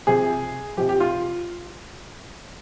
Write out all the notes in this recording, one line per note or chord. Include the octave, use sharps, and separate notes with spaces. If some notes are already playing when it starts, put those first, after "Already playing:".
C3 F3 G#4
C3 F3 G4
G4
F4